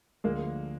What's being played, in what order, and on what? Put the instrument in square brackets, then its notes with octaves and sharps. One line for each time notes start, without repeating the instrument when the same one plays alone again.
[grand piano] D2 D3 F3 [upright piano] G#3 A#3